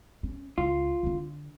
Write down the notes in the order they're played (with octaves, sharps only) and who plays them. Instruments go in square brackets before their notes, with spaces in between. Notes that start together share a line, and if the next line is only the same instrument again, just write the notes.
[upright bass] C#4
[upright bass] C#2 [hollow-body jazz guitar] F4
[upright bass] D3 D4